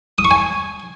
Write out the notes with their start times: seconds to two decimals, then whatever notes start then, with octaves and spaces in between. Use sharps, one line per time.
0.18 D#6
0.25 C#6
0.31 G#5